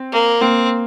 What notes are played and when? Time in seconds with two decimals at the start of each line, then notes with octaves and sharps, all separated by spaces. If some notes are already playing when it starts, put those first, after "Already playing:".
Already playing: C4
0.12 A#3
0.41 A#3 C4